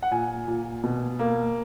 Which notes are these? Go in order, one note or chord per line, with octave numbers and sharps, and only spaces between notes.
F#5
A#2 G#5
A#2
B2
A#3